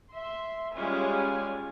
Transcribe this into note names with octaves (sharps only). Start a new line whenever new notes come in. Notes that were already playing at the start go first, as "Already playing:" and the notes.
E5 C6
G3 G#3 C#4 F4 G#5